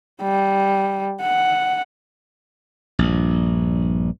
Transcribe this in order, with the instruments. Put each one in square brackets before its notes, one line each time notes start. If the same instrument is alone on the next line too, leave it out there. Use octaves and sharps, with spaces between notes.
[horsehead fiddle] G3
F#5
[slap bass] A#1 G2